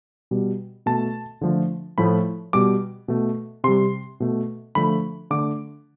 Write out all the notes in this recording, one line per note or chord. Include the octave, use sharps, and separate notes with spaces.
B2 G3
B2 A3 A5
D3 F3 A3
A2 F3 A3 B5
B2 G3 D6
B2 A3
C3 G3 C6
B2 A3
D3 F3 A3 B5
D3 A3 D6